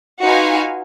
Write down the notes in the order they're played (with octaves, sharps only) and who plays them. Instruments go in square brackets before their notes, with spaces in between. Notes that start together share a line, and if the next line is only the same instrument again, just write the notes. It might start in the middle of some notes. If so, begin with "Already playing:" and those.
[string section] D#4 F#4 [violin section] F4 B4 F5 G#5